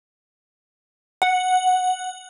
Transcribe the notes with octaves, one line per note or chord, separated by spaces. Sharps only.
F#5